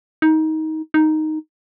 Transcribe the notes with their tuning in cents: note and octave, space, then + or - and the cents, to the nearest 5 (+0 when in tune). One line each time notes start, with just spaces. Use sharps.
D#4 +20
D#4 +0